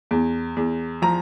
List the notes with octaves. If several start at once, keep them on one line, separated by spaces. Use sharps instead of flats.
E2
E2
F3 A#5